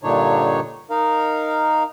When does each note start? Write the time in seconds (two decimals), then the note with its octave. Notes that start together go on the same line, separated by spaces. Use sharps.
0.03 G2 A#2 D3 D4 D#4 C#5
0.90 D#4 A#4 F5